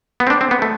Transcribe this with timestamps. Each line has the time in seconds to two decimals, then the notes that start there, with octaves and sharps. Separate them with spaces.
0.20 B3
0.27 C4
0.30 D4
0.41 C4
0.51 B3
0.62 A3